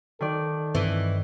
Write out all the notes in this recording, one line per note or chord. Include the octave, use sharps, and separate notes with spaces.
D#3 A4 D5
G2 E3 C4